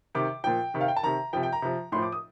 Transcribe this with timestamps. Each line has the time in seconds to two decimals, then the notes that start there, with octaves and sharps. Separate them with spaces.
0.15 C3 D#3 D6
0.44 A#2 F3 G5
0.74 C3 D#3
0.81 F5
0.88 G5
0.96 A5
1.03 C3 D#3 A#5
1.33 C3 F3 G5
1.43 G5
1.52 A#5
1.62 C3 F3
1.92 A2 F3 C6
2.02 D6
2.12 D#6